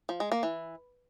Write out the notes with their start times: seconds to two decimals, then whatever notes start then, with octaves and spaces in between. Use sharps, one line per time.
0.09 F3
0.20 G#3
0.32 A#3
0.43 E3